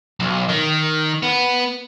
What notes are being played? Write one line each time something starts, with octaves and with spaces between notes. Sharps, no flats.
B1
D#3
B3